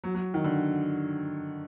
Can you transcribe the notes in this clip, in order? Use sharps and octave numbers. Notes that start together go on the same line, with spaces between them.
F#3
F#3
D#3
D3